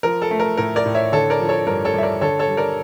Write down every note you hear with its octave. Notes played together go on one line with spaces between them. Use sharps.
F3 A#4
A4
A3
A#4
A2 A#4
A#4 D5
A2
C#5 E5
D3 A4 C#5
A#4 D5
F3
A4 C#5
G2 A#4
A4 C#5
G2 E5
A#4 D5
D3 A4 C#5
A4 C#5
G3
A#4 D5